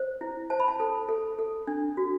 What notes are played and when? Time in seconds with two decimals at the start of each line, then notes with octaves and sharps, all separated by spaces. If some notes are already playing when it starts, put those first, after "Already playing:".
Already playing: C5
0.21 E4
0.50 C5 A5
0.60 B5
0.68 A5
0.80 A4
1.09 A4
1.39 A4
1.67 D4
1.97 F#4